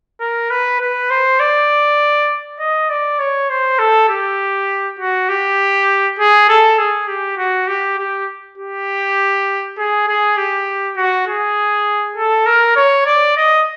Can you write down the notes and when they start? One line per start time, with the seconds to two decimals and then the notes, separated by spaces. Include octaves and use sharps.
0.21 A#4
0.50 B4
0.80 B4
1.10 C5
1.40 D5
2.59 D#5
2.90 D5
3.19 C#5
3.49 C5
3.79 A4
4.09 G4
4.99 F#4
5.29 G4
6.19 G#4
6.49 A4
6.78 G#4
7.08 G4
7.37 F#4
7.67 G4
7.98 G4
8.58 G4
9.78 G#4
10.08 G#4
10.37 G4
10.96 F#4
11.27 G#4
12.16 A4
12.46 A#4
12.76 C#5
13.06 D5
13.37 D#5